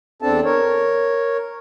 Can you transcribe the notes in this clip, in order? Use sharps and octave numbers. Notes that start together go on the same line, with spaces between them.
E2 C4 D4 A4 A5
A#4 C#5